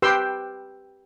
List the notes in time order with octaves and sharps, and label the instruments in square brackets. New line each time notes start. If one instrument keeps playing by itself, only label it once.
[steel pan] G4 B4 G5 C6 E6